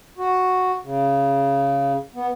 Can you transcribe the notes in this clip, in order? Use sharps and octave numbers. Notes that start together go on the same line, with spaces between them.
F#4
C#3
B3